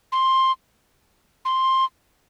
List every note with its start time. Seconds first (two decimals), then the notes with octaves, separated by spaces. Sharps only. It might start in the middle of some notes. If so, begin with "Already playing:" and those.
0.12 C6
1.45 C6